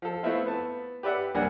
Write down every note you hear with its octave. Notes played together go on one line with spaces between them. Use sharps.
F3 A4
A3 B3 C4 E4 F4
B3 A5
G4 B4 D5 E5 F#5
C2 A#3 D4 F#5 G#5